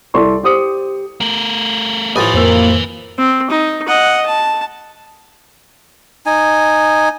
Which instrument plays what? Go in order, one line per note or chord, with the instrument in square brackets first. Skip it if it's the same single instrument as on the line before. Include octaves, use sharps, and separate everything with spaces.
[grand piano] C2 E4 A4 D5 C6 C#6
G4 C5 D6 D#6 C#7
[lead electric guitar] A3 A#4
[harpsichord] A1 A2 F3 [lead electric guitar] B4 G#5 [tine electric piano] D#6
[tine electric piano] F2 C5 E6 [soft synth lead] A#3
[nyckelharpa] C4
D#4
D#5 F#5
A5
[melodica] D#4 G#5